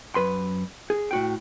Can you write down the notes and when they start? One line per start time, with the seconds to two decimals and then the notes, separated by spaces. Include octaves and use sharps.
0.15 F#2 B4 C6
0.90 G#4
1.11 A2 F#4 G5